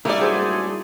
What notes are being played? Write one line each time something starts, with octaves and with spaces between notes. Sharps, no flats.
F#2 A2 G3 A3 A#3 D#4 E4 D5
F#4 G#4 C5